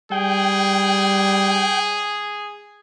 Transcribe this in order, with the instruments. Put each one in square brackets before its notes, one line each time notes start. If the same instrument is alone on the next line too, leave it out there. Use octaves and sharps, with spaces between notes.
[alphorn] G3 [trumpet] G#4 [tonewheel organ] G5